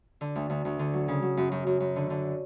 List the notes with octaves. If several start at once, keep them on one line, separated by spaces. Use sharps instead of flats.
D3
D2
D2
D2
D3
F#3
C#3
F#3
F#2
F#2
F#2
F#2
D3
D3